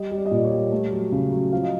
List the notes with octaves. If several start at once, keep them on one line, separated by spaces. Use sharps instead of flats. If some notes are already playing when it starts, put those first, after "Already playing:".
Already playing: G3 D#5
G3
D5
D#5
A#2 D5
C#5
G3
A3
F#3
C#3
F#3
F3 F5
D#5